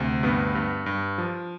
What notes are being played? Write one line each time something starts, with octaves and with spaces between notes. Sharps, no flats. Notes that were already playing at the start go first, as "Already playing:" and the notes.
Already playing: D2 C3
G2 B3
G2
G2
F3